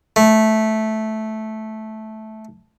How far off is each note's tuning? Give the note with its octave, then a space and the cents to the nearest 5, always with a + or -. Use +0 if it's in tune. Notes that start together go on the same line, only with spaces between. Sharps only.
A3 -10